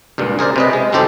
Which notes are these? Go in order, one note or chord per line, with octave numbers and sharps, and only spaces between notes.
C#2 G2 A#2
G#4 A#4 C5 D5
C3 B4 D#5
G#3
C2 F#2 D#3 G4 A4 C5